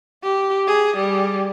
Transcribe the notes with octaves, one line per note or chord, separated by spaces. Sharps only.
G4
G#4
G3